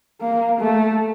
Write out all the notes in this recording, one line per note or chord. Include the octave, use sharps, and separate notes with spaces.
A#3
A3